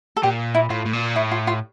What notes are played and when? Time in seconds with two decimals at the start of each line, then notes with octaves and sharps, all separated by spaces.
0.17 A4
0.23 A#2 G4
0.55 E4
0.70 A2 F4
0.86 A2
0.93 A#2
1.16 A2 E4
1.31 F4
1.47 F4